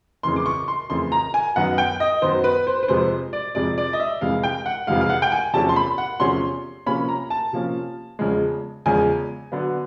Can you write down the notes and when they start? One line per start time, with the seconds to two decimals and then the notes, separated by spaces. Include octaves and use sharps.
0.23 F2 C#3 E3 A3 C6
0.36 D6
0.46 C#6
0.68 C6
0.90 F2 C#3 E3 A3 C6
1.12 A#5
1.34 G#5
1.56 F#2 D#3 F#3 B3 F#5
1.78 G5
2.00 D#5
2.22 F#2 D#3 F#3 B3 C5
2.44 B4
2.67 C5
2.83 B4
2.88 F2 C3 F3 G#3 C5
3.33 D5
3.55 F2 C3 F3 G#3 D5
3.78 D5
3.93 D#5
4.00 E5
4.21 F2 C3 E3 G#3 F5
4.44 G5
4.66 F#5
4.87 F2 C3 E3 G#3 F5
5.01 F5
5.10 F#5
5.22 G5
5.32 G#5
5.53 E2 C3 F3 A3 C#4 A5
5.69 C6
5.76 B5
5.98 F#5
6.20 E2 C3 F3 A3 C#4 C6
6.86 C3 F3 A#3 C#4 B5
7.09 A#5
7.30 A5
7.53 C3 F3 A#3 C#4
8.19 E2 C#3 F3 G#3
8.86 E2 C#3 F3 G#3 G#5
9.52 D3 F#3 B3